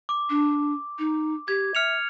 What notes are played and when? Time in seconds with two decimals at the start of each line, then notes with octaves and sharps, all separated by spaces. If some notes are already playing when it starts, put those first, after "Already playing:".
0.09 D6
0.30 D4
0.99 D#4
1.48 G4 G#6
1.75 E5 F6 C#7 F7